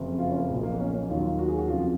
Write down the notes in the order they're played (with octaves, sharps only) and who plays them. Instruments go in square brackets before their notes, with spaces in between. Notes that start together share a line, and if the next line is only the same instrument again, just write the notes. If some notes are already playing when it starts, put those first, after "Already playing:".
Already playing: [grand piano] F#1 F2 F3
F4
C#4
A#3
B1 A#2 F3
A#3
B3
C#4
C#4
D#2 D#3 F#3 F4
F4
F#4
G#4
F#4
F2 C#3 F3 F4